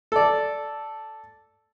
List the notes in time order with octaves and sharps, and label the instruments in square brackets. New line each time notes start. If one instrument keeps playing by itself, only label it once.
[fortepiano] A4 D5